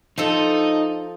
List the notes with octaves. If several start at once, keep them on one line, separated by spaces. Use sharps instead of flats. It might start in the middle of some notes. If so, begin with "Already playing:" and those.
F3 D#4 A4